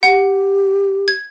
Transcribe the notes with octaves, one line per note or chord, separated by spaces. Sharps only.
G4 F#5
G#6